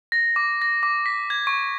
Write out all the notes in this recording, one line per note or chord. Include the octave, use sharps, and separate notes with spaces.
A#6
D6
A#6
D6
B6
G#6
C#6